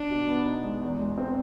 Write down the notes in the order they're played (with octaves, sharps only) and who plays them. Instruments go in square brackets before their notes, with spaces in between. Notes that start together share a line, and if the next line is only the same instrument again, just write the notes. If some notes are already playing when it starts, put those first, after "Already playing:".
Already playing: [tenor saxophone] D4
[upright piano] B2
B3
D#4
G#3
E2
G#3
C4